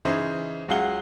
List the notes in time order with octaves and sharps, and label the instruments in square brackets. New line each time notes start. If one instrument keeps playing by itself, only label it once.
[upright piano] C#3 E3 D#4 G#4 C5
C#2 F#3 G#4 F5 F#5 G7